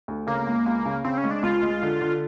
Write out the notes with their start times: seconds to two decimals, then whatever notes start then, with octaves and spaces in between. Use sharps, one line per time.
0.08 D2
0.27 C#3 A#3
0.47 C#2
0.66 C#2
0.85 C#3
1.04 C#3 C4
1.18 C#4
1.24 G#3
1.31 D4
1.43 C#2 F4
1.63 G#3
1.82 D3
2.01 D3